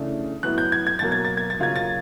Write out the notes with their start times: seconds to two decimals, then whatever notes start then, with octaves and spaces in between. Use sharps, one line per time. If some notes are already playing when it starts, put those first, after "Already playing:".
Already playing: C#3 E3 A3 D4
0.43 A2 F#3 B3 F#6
0.58 G6
0.72 G#6
0.87 G#6
0.99 B2 F#3 A#3 A6
1.12 G#6
1.25 A6
1.37 G#6
1.50 A6
1.60 C#3 F#3 A#3 C#4 F4 G#6
1.76 A6